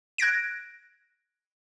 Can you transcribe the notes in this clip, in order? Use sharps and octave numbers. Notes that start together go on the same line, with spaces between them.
F#6 G#6 A#6 D7